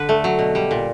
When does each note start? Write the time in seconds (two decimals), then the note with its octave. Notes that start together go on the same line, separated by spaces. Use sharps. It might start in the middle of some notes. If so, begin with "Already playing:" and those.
Already playing: D3 B4
0.09 A3
0.24 F#3
0.39 B2
0.55 G3
0.71 A#2